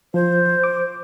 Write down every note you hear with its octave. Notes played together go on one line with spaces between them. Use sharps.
F3 C5
D6